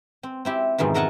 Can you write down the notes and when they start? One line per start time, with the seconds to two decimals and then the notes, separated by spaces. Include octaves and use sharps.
0.23 C4
0.45 C4 E4 G4
0.78 F2 G#2 B2 D#3 E3
0.94 A4 A#4 D#5 F#5 G#5 A5